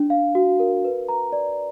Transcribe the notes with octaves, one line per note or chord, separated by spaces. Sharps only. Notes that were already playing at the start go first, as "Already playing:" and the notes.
Already playing: D4
F5
F#4
A#4
B4
A#5
D5